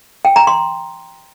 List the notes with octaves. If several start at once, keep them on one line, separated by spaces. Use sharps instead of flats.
G5
A#5
C6